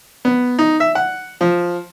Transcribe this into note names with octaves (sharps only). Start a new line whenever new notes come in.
B3
D#4
E5
F#5
F3